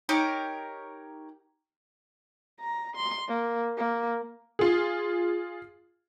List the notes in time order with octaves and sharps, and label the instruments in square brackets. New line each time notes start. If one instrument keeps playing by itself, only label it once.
[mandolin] D#4 G4 A#4 C#5
[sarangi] A#5
C6
A#3
A#3
[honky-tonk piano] F4 G#4